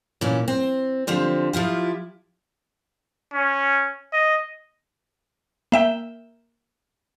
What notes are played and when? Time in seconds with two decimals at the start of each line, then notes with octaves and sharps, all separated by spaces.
0.21 A#2 E3 C#4
0.48 C4
1.07 D3 F3 C4 G4
1.53 F3 E4 F4 G4
3.33 C#4
4.13 D#5
5.72 A#3 E5 G5